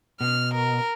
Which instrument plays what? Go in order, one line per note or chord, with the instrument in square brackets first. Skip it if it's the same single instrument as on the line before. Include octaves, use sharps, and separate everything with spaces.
[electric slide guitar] B2 [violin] F6
[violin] A#4